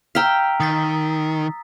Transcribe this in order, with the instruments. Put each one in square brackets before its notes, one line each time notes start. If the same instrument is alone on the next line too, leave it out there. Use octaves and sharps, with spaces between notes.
[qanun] F5 G5 [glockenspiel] A#5 E6 B6
[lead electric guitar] D#3 [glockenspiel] D#6 A6 B6